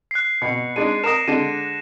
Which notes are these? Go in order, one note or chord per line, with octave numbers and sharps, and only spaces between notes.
F#6 C7
B2 C#7
G#3 D4 D#4 D#7
A#4 D#6 A#6 E7
D3 G#3 D4 D#7